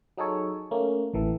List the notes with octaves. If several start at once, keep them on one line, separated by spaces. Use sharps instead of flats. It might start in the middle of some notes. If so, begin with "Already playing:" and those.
F#3 D#4 G#4 A4 C#5
A3 A#3 C#4
A1 E3 A4